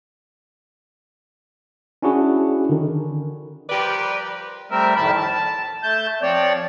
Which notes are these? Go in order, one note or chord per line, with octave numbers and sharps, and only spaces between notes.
C#4 D4 E4 F#4 G#4
D3 D#3
F3 G3 G4 A#4 B4 D5
G3 A3 C4 A#4 E5
F2 A2 D#3 A5 B5
A5
A3 A5 G6
F3 C4 C#5 D5